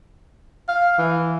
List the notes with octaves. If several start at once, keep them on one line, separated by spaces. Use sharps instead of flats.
F5
E3